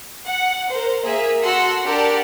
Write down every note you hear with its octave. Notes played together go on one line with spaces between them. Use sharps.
F#5
A#4 C5
A#3 G#4 E5
F#4 A4 F#5 C6 E6
D4 G4 A#4 D5 F#5 A5